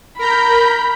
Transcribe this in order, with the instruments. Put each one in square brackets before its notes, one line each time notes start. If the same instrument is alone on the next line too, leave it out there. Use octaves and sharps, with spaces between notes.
[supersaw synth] A#4 A#5 G6 [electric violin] B5